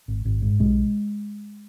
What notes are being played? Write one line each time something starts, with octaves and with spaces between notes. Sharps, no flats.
G#1
G#1
G#2
B1 G#3